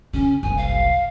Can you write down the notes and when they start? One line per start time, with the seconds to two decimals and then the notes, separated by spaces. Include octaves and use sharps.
0.13 C#3 C#4
0.43 F#1 C2 G#5
0.57 F5